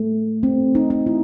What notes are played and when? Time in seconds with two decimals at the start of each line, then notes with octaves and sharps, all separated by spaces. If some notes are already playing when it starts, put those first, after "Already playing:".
Already playing: A3
0.43 C4
0.75 D#4
0.90 D#4
1.06 E4